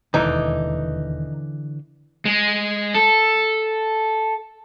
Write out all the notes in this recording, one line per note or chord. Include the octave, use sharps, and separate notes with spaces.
E1 D#2 D3 E3 D#4
G#3
A4